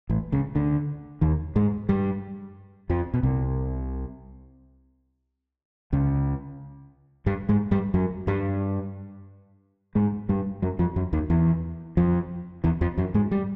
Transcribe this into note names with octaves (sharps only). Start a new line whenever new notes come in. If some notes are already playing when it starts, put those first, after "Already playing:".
A1 A2
C#2 C#3
D2 D3
D#2 D#3
G#2 G#3
G2 G3
F2 F3
B2
C2 C3
C#2 C#3
G2 G3
G#2 G#3
G2 G3
F#2 F#3
G2 G3
G#2 G#3
G2 G3
F#2 F#3
F2 F3
F#2 F#3
D#2 D#3
E2 E3
F2 F3
E2 E3
F2 F3
F#2 F#3
G#2 G#3
G3